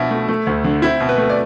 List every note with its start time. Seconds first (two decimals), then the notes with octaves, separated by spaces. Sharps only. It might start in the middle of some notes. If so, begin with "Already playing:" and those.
Already playing: B2 F3 D4 E4
0.11 A3
0.28 A3
0.47 D2
0.64 D3
0.82 C4 E4
1.00 B2
1.09 B4
1.18 A3
1.30 D5